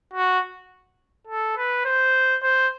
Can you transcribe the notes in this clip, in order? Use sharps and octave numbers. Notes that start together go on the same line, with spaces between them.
F#4
A4
B4
C5
C5